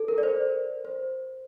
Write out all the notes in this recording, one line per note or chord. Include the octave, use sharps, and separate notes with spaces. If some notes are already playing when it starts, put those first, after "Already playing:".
Already playing: A4
A#4
D5
C5
C5